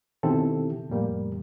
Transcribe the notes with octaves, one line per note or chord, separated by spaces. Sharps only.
B2 D#3 C4 E4 G4 A4
F2 A2 G3 A#3